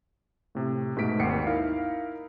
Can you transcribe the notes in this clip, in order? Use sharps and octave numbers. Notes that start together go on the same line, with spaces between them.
A2 C3
G#2 B2 A3 B6 D7
G#1 D#2 F#5 G5 C7 C#7
D#4 E4 A#4 F5